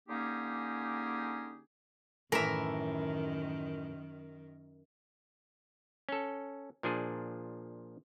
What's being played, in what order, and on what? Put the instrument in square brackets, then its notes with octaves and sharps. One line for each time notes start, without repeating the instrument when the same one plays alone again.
[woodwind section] D3 A#3 C#4 D#4 G4 G#4
[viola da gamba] F#2 D#3 [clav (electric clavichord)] A2 E3 A#5 [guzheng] A#4 E5
[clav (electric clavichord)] C#4 A4
A#2 F3 D4 G#4